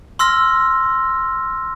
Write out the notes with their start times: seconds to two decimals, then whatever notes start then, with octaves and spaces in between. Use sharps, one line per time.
0.19 C6 E6 F6 A#6